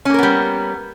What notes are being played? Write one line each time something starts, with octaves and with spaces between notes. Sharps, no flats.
G3 A#3 B3 C#4 A#4